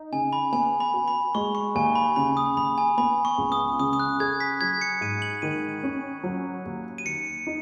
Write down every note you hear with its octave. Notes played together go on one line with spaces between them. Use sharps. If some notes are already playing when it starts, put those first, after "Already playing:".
Already playing: D#4
C#3 G#5
B5
B3 G#5
B5
F#4
B5
G#3 C#6
C#6
D#2 G#5
B5
C#3 B5
D#6
D#2 B5
G#5
B3 B5
C#6
C#2
D#6
C#3 D#6
D#6
F#6
G#4 G#6
B6
F#3 G#6
C#7
G#2 D#7
F#7
D#3 D#7
C#4
F#3
D#2
D#7
D#3 C#7
D#4